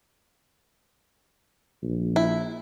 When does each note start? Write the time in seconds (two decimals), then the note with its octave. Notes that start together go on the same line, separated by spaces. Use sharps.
1.83 A#1
2.16 E4